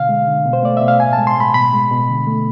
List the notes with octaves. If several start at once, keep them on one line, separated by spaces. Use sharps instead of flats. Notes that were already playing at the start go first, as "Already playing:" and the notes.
Already playing: B2 D3 F5
G#3
D3
B2
C5
A3 D5
B2 E5
F5
A2 G#5
A5
G#3
C6
A2 B5
B2 B5
G#3
B2
D3
A3